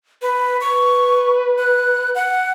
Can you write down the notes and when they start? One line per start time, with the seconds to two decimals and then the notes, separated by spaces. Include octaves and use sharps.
0.22 B4
0.61 B4 C#6
1.59 F#6
2.15 F#5